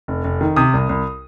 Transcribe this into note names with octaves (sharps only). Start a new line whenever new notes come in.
F1
F1
D#3
C3 D#6
C2
C2